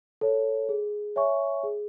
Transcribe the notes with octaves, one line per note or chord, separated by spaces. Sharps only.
A4 C#5
G#4
C#5 E5 G#5 C#6
G#4